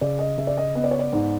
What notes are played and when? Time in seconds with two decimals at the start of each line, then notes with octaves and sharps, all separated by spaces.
0.01 C#3 D5
0.19 D#5
0.38 C#3 E5
0.47 D5
0.57 D#5
0.75 B3 D#5
0.84 D5
0.91 C#5
0.99 D5
1.13 G#2